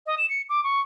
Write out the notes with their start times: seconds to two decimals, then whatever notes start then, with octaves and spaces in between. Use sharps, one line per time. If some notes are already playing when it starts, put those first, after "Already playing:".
0.06 D#5
0.18 E7
0.29 C#7
0.49 D6
0.64 C#6